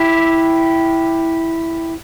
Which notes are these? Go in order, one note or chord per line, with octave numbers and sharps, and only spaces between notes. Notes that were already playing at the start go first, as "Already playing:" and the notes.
Already playing: E4 G4